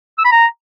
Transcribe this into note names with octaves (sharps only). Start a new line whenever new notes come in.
E6
B5
A#5